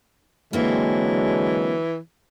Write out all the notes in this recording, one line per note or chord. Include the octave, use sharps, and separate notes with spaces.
D3 E3 F#3 G#3 A#3 C4 F#4